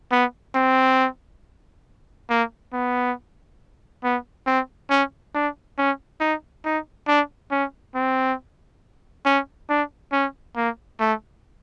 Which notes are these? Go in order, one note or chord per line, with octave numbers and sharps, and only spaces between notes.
B3
C4
A#3
B3
B3
C4
C#4
D4
C#4
D#4
D#4
D4
C#4
C4
C#4
D4
C#4
A#3
A3